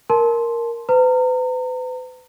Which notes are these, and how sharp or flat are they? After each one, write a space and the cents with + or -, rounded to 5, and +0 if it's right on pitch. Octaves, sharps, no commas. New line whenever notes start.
A#4 +0 A5 -20 C6 +0
B4 +40 A#5 -35